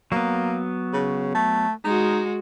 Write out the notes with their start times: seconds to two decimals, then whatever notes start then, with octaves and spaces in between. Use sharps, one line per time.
0.12 F#3 A#3 B3
0.93 C#3
1.35 A3
1.85 G#3 D#4 F#4